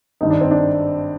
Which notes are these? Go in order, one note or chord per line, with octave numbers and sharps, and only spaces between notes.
G#1 G2 D#3 D#4
D4
C4
D4